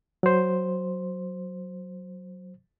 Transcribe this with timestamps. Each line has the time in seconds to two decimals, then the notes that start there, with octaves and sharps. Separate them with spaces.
0.23 F#3 C5